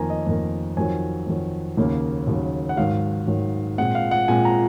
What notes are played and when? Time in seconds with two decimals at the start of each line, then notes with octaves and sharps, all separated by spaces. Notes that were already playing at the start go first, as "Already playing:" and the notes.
Already playing: F2 D#3 A#3 G#5 A#5
0.10 D#5
0.26 F2 D#3 A#3
0.77 F2 D#3 F#3 G#5
1.26 F2 D#3 F#3
1.77 D#2 C#3 F#3 A#3
2.27 D#2 C#3 F#3 A#3
2.69 F#5
2.77 G#2 D#3 F#3 F5
3.27 G#2 D#3 F#3
3.78 A#2 G#3 C4 F#5
3.95 F5
4.11 F#5
4.28 A#2 G#3 C4 G#5
4.45 A#5